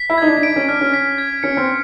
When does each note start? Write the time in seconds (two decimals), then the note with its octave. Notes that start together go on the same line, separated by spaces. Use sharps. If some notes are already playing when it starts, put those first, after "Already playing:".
Already playing: B6
0.10 E4
0.18 D#4 G#6
0.27 D4
0.37 D4
0.43 D#4 D7
0.56 C#4
0.68 D4 F6
0.81 C#4
0.94 B6
1.18 G#6
1.43 C#4 C#7
1.57 C4